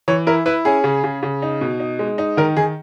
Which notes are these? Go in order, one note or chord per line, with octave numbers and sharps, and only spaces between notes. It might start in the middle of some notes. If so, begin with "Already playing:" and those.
E3 C#5
E4 A#4
E4 B4
C#4 G#4
C#3
C#3
C#3
D#4
B2
D#4
G#3
D#4
D#3 A#4
D#3 G#4